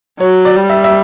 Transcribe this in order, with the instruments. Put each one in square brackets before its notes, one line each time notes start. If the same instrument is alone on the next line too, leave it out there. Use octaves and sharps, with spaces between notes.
[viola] F#3 [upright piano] C#5
[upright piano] D5
[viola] G3
[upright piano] E5
E5